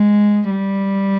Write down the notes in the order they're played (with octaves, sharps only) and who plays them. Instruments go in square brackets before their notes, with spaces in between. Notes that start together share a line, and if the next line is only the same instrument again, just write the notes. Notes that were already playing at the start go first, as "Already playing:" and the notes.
Already playing: [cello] G#3
G3